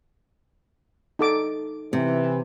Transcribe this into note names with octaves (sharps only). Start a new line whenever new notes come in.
D#4 A4 D6
C3 E3